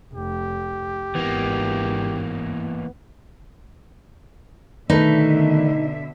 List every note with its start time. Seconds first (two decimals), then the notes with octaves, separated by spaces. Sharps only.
0.13 F1 G4
1.15 G#1 E3 A#3 B3
4.90 B2 D3 D#3 A3 D#4 B4 E5